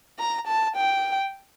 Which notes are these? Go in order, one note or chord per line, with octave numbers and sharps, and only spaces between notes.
A#5
A5
G5